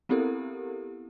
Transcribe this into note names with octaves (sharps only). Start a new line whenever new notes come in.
B3 C4 E4 G4 A4 A#4